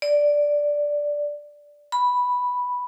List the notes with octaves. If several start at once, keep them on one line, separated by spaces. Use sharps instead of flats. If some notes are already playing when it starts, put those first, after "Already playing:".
D5
B5